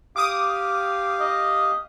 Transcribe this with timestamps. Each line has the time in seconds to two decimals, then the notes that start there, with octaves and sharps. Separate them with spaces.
0.16 G4 F5 D6 D#6
1.20 D#5